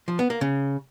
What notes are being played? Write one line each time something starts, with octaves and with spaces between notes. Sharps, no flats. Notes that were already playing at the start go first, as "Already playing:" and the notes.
F3
B3
A#3
C#3